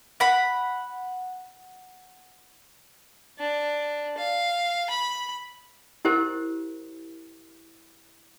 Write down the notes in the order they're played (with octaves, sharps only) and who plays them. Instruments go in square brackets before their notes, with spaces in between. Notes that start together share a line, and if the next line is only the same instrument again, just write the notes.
[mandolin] F#5 B5
[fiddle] D4
F5
B5
[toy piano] E4 G4 A#4 C5